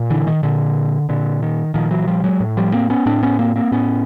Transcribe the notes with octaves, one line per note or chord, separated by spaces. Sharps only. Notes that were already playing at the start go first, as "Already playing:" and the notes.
Already playing: A#2
D3 E3
D#3
A#2 D3
A#2 D3
D#3
A#2 D#3 F3
E3 F#3
F3 G3
F#3 G#3
A2
F3 G3
A#3 C4
B3 C#4
A2 C4 D4
B3 C#4
A#3 C4
A#3 C4
A2 B3 C#4